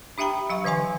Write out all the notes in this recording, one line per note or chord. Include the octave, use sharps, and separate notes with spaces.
D4 G4 E5 G5 A#5 B5
F#3 F5 C#6
D3 E3 D#5 G#5 C6